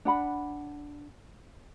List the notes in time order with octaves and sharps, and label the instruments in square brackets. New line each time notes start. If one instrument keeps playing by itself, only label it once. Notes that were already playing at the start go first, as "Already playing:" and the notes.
[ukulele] D4 F#5 B5